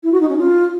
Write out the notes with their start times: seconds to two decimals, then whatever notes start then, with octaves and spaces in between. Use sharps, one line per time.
0.03 E4
0.12 F#4
0.21 D#4
0.29 C#4
0.38 F4